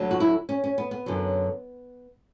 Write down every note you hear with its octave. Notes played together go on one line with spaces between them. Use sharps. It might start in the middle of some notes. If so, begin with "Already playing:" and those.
Already playing: D2 D3 F#3
F#4
E4
C#4
C#4
B3
B3
F#2 D3 F#3